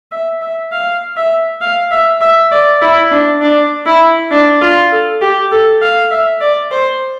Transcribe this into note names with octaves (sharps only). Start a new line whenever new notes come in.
E5
E5
F5
E5
F5
E5
E5
D5
E4
D4
D4
E4
D4
F4
A4
G4
A4
F5
E5
D5
C5